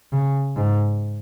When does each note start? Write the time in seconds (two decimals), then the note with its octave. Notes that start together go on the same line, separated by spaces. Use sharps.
0.13 C#3
0.56 G#2